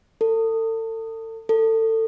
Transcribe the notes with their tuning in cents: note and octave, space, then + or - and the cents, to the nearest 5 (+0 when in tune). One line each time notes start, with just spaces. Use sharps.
A4 +35
A4 +25